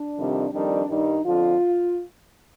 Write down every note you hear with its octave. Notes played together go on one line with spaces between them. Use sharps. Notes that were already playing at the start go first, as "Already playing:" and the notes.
Already playing: D4
F2 C3 D#3 G3
F2 D#3 G3 D4
G2 D#3 G3 D#4
F2 D3 F3 F4